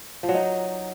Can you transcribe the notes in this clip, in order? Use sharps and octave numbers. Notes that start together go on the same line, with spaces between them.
F3
F#3
D#4